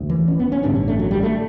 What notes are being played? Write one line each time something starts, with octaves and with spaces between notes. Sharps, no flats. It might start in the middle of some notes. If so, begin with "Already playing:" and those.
Already playing: E1 D2
E3
C#4
B3
C#4
A1 G2 D3 D4
C#4
A3
F#3
G3
A3